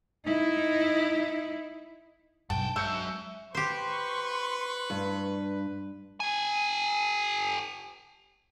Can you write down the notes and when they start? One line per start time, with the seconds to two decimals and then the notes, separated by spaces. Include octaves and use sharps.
0.25 D#4 E4
2.50 B1 G2 F#5 G5 A5
2.76 F#2 G#3 E5 E6 G6 C#7
3.55 G4 B4 C5 C6 C#6
4.90 G2
6.20 G4 G#5